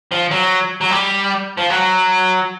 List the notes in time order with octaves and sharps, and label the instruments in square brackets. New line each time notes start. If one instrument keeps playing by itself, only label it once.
[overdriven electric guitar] F3
F#3
F#3
G3
F3
F#3